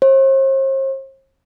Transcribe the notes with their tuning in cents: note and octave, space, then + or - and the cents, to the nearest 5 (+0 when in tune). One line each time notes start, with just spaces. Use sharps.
C5 +45